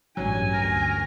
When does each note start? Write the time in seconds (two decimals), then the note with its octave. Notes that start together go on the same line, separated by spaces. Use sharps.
0.17 A1 G2 F#3 C#4 G#5
0.54 D2 A#4